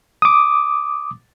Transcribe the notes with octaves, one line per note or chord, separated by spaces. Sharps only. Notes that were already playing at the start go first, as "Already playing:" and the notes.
D6 D#6